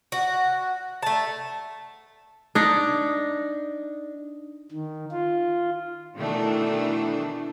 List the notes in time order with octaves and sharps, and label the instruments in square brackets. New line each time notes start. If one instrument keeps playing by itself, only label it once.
[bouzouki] F#4
A3 A5
[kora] D4 D#4
[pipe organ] D#3
F4
[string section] B2 D#3 E3 A3 D4